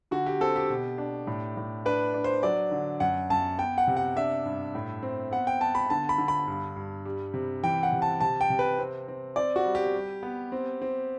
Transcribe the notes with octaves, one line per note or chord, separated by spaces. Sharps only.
D3 F#4
G4
C4 A4
G4
B2
D4
A2
A2
D4 B4
D4
C5
F#3 D5
D3
F#2 F#5
F#2 A5
B3 G5
F#5
C3
F#5
D4 E5
G2
A2
C4
B3 F#5
G5
B3 A5
B5
D3 A5
B5
D3
B5
G2
G2
G3
C3
E3 G5
F#5
C3
A5
C3 A5
G5
C3
B4
C4
C4
C4 D5
F#4
G3
G4
G3
B3
C4
C4